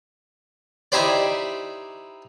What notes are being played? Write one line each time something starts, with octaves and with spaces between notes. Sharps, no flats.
D#4 E4 G4 C5 D5